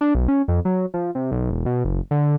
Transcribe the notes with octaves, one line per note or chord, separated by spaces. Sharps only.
D4
B1
C#4
F2
F#3
F3
C3
B1
E1
B2
F#1
D3